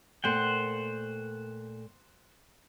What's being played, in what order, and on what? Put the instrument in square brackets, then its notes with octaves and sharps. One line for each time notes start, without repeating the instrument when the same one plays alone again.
[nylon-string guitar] A#2 A3 A#3 [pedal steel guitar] C5 F#5 G5